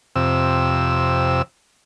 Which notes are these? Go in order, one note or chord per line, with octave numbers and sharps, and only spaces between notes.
F2 C3 E6